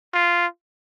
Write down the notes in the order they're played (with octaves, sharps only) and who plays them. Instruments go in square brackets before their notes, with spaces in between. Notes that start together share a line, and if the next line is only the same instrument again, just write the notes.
[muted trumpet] F4